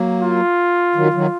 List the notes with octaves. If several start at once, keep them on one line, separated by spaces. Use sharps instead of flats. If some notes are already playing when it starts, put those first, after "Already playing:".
Already playing: F#3 A#3
F4
D#3 F#3
D#3 F#3